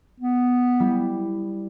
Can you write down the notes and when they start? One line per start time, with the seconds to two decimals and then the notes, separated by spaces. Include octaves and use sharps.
0.20 B3
0.80 G3 E4